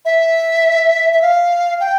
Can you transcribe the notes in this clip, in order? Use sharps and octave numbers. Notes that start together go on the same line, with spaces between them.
E5
E5
F5
G5